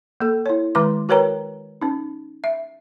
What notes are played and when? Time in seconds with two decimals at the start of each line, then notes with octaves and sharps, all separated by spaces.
0.21 A#3 A4
0.46 E4 C#5
0.75 D#3 G#3 B4 C6 D6
1.09 F#4 A#4 B4 C#5 G5 A#5
1.82 C#4 D#4
2.44 E5